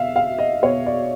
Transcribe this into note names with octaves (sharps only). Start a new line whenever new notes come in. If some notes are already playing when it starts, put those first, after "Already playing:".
Already playing: B2 E5 F5
F5
D#5
B2 C#5
D5